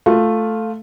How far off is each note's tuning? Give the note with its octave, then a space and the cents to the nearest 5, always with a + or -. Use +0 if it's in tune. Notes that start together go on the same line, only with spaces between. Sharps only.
A3 +0 F4 +0